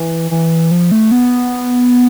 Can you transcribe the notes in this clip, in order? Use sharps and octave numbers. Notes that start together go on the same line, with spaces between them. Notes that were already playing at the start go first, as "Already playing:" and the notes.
Already playing: E3
E3
F3
A3
B3